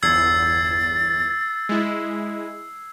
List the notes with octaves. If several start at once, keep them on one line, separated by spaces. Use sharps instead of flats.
G1 E2 E6 G#6 A6 C7
G#3 E4